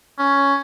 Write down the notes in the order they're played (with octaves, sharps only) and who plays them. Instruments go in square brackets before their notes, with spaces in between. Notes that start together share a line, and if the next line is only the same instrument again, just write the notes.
[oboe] C#4